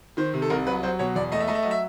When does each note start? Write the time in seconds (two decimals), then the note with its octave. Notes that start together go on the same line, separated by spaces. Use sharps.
0.17 D#3 C5
0.34 C3
0.42 A4
0.50 C2 A#4
0.67 F#3 B4
0.83 F#3 C5
0.99 B2 C#5
1.15 E2 D5
1.32 A3 D#5
1.40 E5
1.47 A3 D#5
1.55 E5
1.63 F#3 D#5
1.71 E5